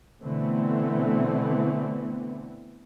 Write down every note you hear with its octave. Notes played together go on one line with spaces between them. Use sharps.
B2 D3 E3 A3 B3 C4